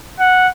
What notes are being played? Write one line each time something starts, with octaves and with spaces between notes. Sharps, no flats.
F#5